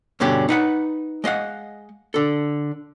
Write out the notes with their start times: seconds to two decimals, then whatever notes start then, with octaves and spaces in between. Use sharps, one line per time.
0.20 G2 B2 D3 C#4 G4
0.49 D#4 B4 F#5
1.24 G#3 D#5 F5 F#5
2.14 D3 A4